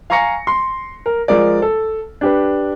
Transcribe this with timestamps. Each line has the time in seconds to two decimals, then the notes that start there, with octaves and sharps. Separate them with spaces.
0.10 F5 G#5 A#5 C#6 A#6 C#7
0.47 C6
1.06 A#4
1.28 F3 G#3 A#4 D5
1.62 A4
2.21 D4 G4 B4